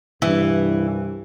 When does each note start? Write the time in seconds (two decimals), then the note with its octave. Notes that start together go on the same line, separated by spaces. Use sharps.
0.22 C2 G2 E3